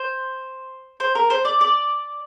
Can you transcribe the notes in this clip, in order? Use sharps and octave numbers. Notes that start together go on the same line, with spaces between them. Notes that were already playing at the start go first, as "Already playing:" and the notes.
Already playing: C5
C5
A#4
C5
D5
D5